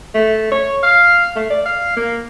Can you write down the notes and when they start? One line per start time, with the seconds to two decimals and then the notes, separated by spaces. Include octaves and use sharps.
0.14 A3
0.52 C#5
0.83 F5
1.36 A3
1.50 D5
1.66 F5
1.97 A#3